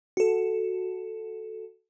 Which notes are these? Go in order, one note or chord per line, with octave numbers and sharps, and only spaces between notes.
F#4 A4